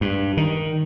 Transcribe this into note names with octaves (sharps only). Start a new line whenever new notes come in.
G2
D#3